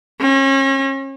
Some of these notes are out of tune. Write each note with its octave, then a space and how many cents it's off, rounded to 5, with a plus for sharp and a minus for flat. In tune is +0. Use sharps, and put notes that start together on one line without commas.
C#4 -35